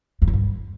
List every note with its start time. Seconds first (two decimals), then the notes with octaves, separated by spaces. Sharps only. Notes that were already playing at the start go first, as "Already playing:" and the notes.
0.22 F2
0.27 F#2
0.33 G2